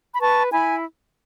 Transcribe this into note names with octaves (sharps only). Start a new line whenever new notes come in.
B5
B4 A5 C#6
E4 G#5 B5